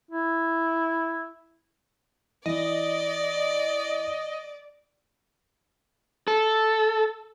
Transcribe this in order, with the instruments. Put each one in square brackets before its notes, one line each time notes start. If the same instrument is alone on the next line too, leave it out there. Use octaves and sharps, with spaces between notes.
[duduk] E4
[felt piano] E3 [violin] D5 [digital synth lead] D#5
[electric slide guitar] A4